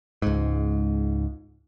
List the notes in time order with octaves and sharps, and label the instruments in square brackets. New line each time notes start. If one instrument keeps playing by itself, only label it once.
[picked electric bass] C#2 G#2